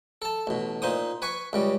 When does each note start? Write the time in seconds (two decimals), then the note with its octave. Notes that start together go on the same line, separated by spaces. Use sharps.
0.22 A4 A5
0.47 A1 B2
0.82 A#2 D#4 C5 D#6
1.22 B4 G#5 C#6
1.53 C#2 C#3 G3